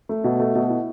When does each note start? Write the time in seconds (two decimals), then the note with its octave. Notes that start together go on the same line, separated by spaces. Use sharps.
0.09 A3
0.24 B2
0.40 A3
0.55 B2
0.70 E4